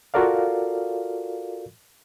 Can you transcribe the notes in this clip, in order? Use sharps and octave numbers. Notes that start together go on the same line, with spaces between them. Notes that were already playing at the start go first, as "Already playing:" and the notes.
F4 F#4 A4 A#4 D5 F5